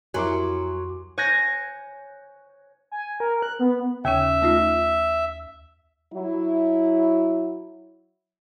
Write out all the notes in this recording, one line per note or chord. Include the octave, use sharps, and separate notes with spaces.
F2 F#3 E4 A#4 G#5 C6 D6
C#5 G#5 F#6 G6 A#6
G#5
A#4
F#6
B3
D#2 C#3 C#4 E5
A3 D#4 F4
F#3 E4